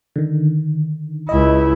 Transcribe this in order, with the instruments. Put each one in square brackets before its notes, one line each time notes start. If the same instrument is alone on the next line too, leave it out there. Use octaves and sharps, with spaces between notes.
[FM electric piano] D3 D#3
[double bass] C#2 E4 [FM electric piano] D#5